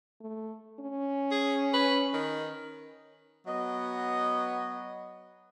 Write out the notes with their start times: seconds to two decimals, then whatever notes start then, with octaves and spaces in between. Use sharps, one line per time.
0.21 A3
0.80 C#4
1.31 G#4
1.74 B4
2.14 D#3
3.47 F#3 B3 D#5